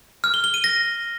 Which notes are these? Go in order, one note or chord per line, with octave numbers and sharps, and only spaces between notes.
F6
G7
G7
D#7
A#6